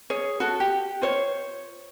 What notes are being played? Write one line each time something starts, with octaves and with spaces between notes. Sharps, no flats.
G#4 C#5
F#4 A4
G4
F4 C5 C#5